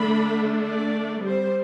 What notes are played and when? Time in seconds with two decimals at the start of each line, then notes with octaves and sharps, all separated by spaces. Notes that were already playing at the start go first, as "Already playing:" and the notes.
Already playing: D3 A3 D4 B5
0.60 D5
1.24 G3 C4 C5